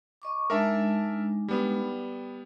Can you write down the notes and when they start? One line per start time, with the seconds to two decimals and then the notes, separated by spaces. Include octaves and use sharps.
0.22 D#5 C#6 D6
0.50 G#3 D4 D#4 A#4 E5 A5
1.48 G3 B3